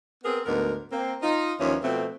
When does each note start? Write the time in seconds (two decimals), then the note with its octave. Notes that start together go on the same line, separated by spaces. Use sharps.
0.24 B3 C4 G#4 A#4
0.46 D2 G#2 G#3 B3 A#4
0.92 A#3 C4
1.23 D#4 F4
1.60 D#2 E3 F3 C#4
1.83 B2 F3 A3 C4